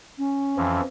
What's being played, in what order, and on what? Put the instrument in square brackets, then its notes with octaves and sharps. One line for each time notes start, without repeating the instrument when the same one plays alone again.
[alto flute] C#4
[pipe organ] F2 E3 F3